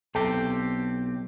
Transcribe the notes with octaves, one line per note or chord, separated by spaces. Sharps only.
B1 C4 G4 A4